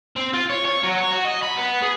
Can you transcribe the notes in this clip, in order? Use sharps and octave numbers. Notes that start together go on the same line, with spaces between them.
C4
F4
C#5
C#5
F#3
C#5
F#4
D#5
B5
B3
G#4